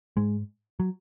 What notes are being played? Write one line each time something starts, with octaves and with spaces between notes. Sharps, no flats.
G#2 G#3
F#3